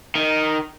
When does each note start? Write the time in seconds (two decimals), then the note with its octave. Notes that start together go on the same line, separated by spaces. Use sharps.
0.15 D#3